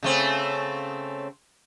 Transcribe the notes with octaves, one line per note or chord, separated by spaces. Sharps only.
C#3 A3 C4